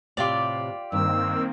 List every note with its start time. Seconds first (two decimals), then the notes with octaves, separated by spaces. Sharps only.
0.17 A2 C3 F4 G4 D5
0.92 G2 D#3 A#3 C4 E6